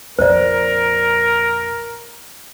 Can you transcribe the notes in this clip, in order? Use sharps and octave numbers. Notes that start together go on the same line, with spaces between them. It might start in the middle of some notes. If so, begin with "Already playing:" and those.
A#1 F2 A#4 C5 D5